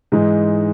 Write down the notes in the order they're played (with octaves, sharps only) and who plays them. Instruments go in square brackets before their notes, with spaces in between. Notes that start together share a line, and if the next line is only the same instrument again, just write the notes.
[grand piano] G#2 E3 G#3 D#4